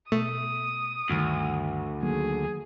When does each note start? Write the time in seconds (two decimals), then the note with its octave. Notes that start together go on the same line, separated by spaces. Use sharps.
0.12 B2 A3 D#6
1.10 D2 G2 D#3
2.03 D#3 F#3 A#3 G#4